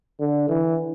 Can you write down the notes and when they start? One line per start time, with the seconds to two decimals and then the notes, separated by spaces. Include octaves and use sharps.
0.19 D3
0.48 E3